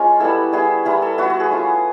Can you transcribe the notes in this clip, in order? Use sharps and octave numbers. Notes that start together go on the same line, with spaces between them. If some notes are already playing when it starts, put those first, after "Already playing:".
Already playing: G#3 C#4 F4 A#4
G3 B3 E4 A4
G3 B3 E4 G#4
G3 B3 E4 A#4
A4
G3 B3 E4 F#4
F#4
G#4
A3 C#4 F4